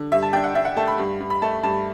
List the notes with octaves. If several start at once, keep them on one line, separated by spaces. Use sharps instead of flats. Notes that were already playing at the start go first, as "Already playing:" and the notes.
Already playing: D3
G2 E5
A5
D4 G5
F#5
D4 E5
F#5
A3 A5
B5
G2
G2
B5
A3 A5
G2 A5